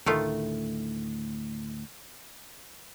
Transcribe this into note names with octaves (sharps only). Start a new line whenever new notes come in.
D2 A2 D#3 A3 F4